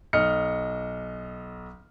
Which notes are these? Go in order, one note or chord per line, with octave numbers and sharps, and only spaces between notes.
B1 D#5 F6 C#7